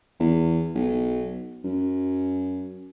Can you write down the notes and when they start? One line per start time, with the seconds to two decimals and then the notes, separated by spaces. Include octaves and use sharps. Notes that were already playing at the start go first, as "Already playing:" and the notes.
0.20 E2
0.75 B1
1.64 F#2